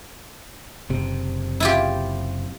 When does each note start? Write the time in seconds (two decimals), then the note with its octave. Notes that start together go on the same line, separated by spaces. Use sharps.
0.90 F#1 C3
1.60 E4 F4 G4